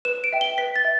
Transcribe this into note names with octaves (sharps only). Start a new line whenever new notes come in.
B4 E7
D7
E5 G5
G7
B4 B6
A6
E5